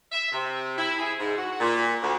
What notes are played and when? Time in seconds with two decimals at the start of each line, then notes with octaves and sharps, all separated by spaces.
0.12 E5
0.32 C3
0.76 E4
0.99 G#4
1.19 G#2
1.36 F#4
1.60 A#2
2.02 D2